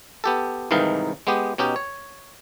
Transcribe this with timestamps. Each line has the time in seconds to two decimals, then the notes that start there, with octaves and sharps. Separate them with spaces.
0.24 B3 G4 A4
0.71 C2 G#2 D#3 E3 D#4 F5
1.27 G#3 B3 G4
1.58 B2 C#4 D#4 G4
1.76 C#5